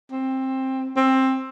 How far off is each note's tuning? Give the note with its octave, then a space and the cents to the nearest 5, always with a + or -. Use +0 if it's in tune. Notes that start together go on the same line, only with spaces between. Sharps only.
C4 +15
C4 +15